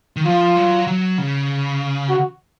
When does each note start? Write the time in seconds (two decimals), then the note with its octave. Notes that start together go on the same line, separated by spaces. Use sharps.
0.16 D#3
0.26 F3 F4
0.56 F#3
0.87 F#3
1.18 C#3
2.10 F#4